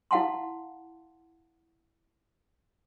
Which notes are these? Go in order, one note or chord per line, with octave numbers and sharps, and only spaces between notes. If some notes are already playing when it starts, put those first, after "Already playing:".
E4 F5 F#5 A5 C6